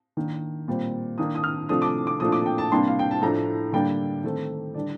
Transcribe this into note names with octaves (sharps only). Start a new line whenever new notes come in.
D#3 A#3 D4
A#2 G3 C4
D#3 A#3 D4 D#6
D#6
F6
C3 F3 A3 D4 D#6
D6
D6
A#2 F3 A3 D4 D#6
D6
G5
A5
C3 G3 A#3 D4 C6
F5
G5
A5
A2 F3 A3 D4 A#5
D3 G3 A#3 D4 G5
D#3 A3 C4
D3 G3 D4 D5